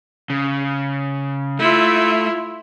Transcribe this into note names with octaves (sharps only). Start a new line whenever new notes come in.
C#3
A3 E4 F4